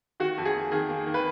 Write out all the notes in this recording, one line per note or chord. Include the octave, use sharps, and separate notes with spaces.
D#3 F#4
F2
G#4
A#3
D#3 G#4
A#3
D#3
B4